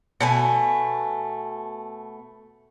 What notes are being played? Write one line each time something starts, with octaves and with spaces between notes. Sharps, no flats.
B2 A3 G#5